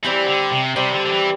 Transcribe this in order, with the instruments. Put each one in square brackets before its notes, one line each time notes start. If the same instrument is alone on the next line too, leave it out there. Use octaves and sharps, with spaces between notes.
[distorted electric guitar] E3 [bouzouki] G3 C4 G4
[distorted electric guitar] D3
C3
[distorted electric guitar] C3 [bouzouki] G3 C4 G4
[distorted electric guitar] E3
D3
D3
E3